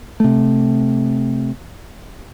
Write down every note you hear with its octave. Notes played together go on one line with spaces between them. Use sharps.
C3 A3